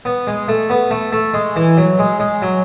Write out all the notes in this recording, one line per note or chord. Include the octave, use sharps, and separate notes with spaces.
B3
G#3
A3
B3
A3
A3
G#3
E3
F#3
G#3
G#3
F#3